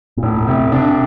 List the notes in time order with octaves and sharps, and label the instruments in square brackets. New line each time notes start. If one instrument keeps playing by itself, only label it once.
[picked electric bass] A#2
[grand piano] E1 [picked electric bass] A2
[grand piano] E1 [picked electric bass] C3
[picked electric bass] C3 [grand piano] D4